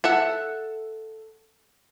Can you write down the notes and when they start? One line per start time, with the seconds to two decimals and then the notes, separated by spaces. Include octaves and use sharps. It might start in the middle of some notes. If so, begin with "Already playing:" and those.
0.04 A4 E5 F#5